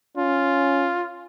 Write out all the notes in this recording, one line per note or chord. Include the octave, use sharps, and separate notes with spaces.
C#4 F4